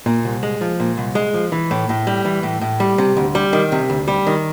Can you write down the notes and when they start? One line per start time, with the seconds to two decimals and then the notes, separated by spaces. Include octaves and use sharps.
0.06 A#2
0.25 C2
0.43 G#3
0.61 F3
0.80 A#2
0.97 C2
1.15 G#3
1.34 F3
1.52 E3
1.71 A2
1.89 A2
2.07 G3
2.25 E3
2.43 A2
2.61 A2
2.80 G3
2.98 C3
3.17 D2
3.35 G3
3.53 D#3
3.72 C3
3.90 D2
4.08 G3
4.27 D#3